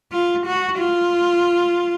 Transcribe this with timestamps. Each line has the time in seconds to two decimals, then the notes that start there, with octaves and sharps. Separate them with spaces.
0.12 F4
0.46 F#4
0.79 F4